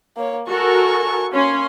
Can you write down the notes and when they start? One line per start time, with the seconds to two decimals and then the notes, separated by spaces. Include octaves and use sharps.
0.17 A#3 C#5
0.48 F#4 A4 A#4 G#5 C#6
1.33 A#3 C#4 C6